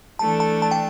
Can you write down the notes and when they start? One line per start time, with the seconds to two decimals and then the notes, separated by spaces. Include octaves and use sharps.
0.19 E3 A3 D4 A4 A5
0.40 A5
0.62 A5
0.71 G5